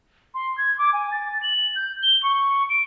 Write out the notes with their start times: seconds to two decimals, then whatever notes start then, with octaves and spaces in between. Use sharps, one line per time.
0.34 C6
0.58 G#6
0.78 D6
0.93 G#5
1.12 A6
1.42 F#7
1.76 G6
2.03 G7
2.23 C#6
2.69 D7